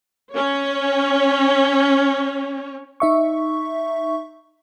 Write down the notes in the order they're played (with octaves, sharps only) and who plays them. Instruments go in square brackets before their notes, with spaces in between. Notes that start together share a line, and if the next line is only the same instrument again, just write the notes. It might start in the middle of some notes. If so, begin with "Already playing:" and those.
[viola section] C#4 C#5
[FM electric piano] D#4 E5 C#6